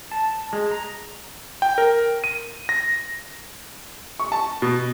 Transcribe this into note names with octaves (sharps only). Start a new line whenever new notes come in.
A5
G#3
A#5
G5
A#4
D#7
A#6
C#6
A5
B2